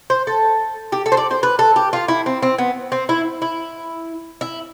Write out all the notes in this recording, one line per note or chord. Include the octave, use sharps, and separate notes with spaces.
C5
A4
G4
A4
C5
D5
C5
B4
A4
G4
F4
E4
C4
C4
B3
C4
E4
E4
E4